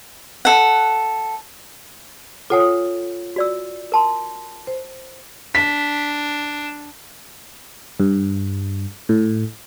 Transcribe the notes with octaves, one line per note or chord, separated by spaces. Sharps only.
A4 F#5
F4 A4 C#5 F#5 G#5 D#6
F#4 D5 E6
A#4 A5 C6
C5
D4 B6
G2
A2